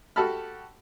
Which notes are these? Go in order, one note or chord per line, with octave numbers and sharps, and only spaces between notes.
F#4 G4 A4 A5 B5 F6